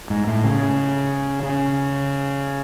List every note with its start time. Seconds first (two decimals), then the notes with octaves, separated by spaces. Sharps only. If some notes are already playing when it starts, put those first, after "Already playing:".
0.10 G#2
0.27 A2
0.44 C#3
1.43 C#3